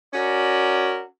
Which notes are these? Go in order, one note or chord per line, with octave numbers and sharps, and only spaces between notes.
C#4 F#4 A#4 D5